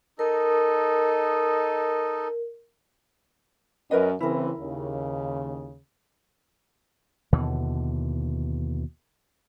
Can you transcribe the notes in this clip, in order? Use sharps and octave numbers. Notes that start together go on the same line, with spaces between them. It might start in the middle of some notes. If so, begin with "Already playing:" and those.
D#4 A4 A#4 D#5
F#2 A#4 B4 D#5
C#3 E3 C4 E4 A#4
D#2 C#3
D#2 B2 D3 E3